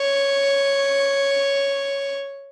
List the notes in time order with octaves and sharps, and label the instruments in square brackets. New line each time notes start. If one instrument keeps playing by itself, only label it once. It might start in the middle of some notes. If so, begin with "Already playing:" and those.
Already playing: [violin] C#5